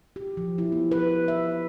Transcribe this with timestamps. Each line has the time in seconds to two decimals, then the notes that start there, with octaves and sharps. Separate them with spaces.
0.16 G4
0.37 F3
0.58 E4
0.72 B3
0.91 B4
1.28 E5